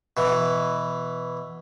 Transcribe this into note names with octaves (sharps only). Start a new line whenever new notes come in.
B2 E3